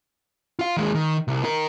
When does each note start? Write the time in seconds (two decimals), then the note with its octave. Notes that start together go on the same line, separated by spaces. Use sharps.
0.59 F4 F5
0.77 D#2 G#3
0.95 D#3
1.28 C2
1.44 D#4 A#4